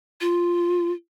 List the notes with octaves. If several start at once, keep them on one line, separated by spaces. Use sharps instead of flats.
F4